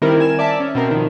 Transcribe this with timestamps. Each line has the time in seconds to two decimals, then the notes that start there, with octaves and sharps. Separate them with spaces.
0.02 D#3 G3 C4 E4 A#4
0.20 G#5 E7
0.39 D5 E5 A5 D6 B6
0.60 C#4
0.75 B2 C4 A#4
0.91 D#3 F3